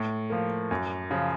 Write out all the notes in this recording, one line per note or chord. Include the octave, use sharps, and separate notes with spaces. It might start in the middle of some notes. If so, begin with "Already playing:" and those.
Already playing: A2
F3 A#3
F#2
C#3 F3